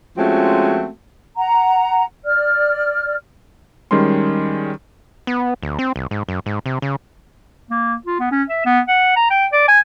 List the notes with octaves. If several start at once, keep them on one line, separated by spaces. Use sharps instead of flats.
F3 G#3 A3 C4 C#4 F#4
F#5 A#5
D5 F6
D#3 G3 G#3 C#4 C6
B3
D2
C4
C2
G#2
F#2
G#2
C3
C#3
A#3
F4
B3
C#4
E5
B3
F#5
A#5
G5
D5
G#5